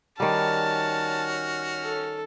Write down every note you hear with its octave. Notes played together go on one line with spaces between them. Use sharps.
D#3 G3 C#4 F#4 A5 F6
A4